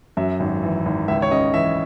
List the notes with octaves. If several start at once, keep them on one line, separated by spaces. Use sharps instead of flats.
F#2 E5
G#1
E3
G#1
C#2 E5
C#5
C#3 D#5
E3 E5